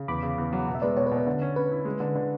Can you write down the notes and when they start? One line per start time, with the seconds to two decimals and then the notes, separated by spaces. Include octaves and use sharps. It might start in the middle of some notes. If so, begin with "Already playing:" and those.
Already playing: C#3
0.08 E2 B5 D6
0.23 C#3
0.38 E2
0.53 F#3
0.68 B2
0.75 E5
0.82 G#3 B4 D5
0.96 B2 C#5
1.07 B4
1.11 B2
1.17 B4
1.27 D3
1.42 C#4
1.56 C#4 B4
1.71 E4
1.85 G#3
2.00 D3
2.15 D3